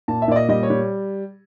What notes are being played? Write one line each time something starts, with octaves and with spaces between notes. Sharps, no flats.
A#2 A5
E5
A#2 D5
D#5
G3 D#5
C#5
G3